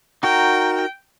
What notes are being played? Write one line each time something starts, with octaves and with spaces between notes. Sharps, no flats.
D#4 F#4 A#4 G5